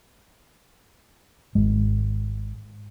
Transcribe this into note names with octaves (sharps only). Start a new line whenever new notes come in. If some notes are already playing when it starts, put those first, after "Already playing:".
G#1 G#3